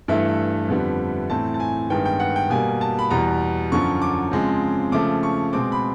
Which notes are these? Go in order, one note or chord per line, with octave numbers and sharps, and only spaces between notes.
G2 E3 A3 E5
F2 D3 G3 B3
A2 E3 A3 C4 A5
A5
G#5
G2 D#3 G#3 B3 G5
G5
F#5
G5
B2 G3 A#3 G#5
A5
B5
E2 B2 G3 A#5
F#2 D3 F3 C#6
D6
C#3 F3 G#3 C4
C#3 F3 A3 D6
C#6
B2 G#3 C4 D6
B5